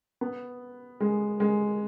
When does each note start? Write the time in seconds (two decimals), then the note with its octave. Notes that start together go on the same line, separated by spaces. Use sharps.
0.21 B3
1.01 G#3
1.40 G#3